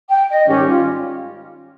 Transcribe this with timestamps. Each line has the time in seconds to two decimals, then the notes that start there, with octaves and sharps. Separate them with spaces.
0.10 G5
0.29 D#5
0.47 G#2 D#3 G3 C#4 G4
0.66 F4